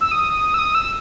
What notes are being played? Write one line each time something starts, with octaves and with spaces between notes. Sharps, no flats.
E6
D#6
E6
D#6
E6